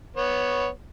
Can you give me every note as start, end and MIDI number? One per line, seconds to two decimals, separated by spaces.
0.17 0.68 59
0.17 0.68 73